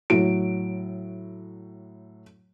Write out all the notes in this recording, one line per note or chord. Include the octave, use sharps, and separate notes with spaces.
A2 F#3 D7